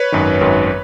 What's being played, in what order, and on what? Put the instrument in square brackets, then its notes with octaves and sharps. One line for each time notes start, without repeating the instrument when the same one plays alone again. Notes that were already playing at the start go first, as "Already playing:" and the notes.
Already playing: [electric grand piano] B4 C#5
G#1 F#2 D#3
G#1 F#2 D#3